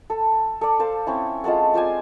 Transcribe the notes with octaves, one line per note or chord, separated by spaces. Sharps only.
A4
A4 D5
A4 C5 F5
C4 C#4 E4
G#3 F4 A4 F#5
F4 C5 D5 G#5